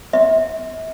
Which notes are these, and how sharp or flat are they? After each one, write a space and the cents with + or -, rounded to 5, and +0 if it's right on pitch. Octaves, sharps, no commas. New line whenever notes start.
E5 -40